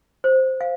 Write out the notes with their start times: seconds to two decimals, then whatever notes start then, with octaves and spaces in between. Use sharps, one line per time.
0.24 C5
0.61 F5